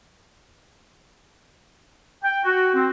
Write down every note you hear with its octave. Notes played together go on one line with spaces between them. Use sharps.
G5
F#4
C4